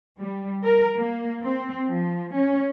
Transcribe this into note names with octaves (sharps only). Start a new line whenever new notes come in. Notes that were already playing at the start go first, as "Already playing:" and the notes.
G3
A#4
A#3
C4
F3
C#4